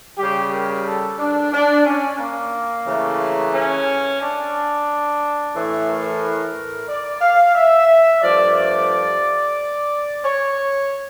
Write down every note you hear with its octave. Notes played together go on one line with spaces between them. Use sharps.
C#3 G3 G4
A#4
A4
D4
D4
C#4
A#3
C#3 E3 A3
C#4
D4
A2 E3 A3
A#4
D5
F5
E5
G2 F3 A3 D5
D5
C#5